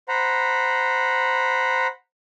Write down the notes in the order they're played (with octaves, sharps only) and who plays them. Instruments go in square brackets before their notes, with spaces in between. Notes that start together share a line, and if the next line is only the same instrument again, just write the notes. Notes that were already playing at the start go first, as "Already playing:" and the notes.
[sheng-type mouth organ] C5 F#5 A#5 B5